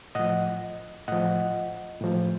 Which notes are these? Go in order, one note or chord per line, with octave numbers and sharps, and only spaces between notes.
A2 F3 D#5 F#5
A2 F3 D#5 F#5
A2 F3